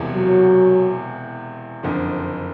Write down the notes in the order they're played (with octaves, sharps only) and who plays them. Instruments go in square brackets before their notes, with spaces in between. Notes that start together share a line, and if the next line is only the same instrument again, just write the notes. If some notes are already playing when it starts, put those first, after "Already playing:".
Already playing: [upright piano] E1 E2 C3
[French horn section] F#3
[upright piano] F#1 F2 D3 F3